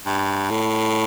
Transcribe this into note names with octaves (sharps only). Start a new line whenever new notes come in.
G2
A2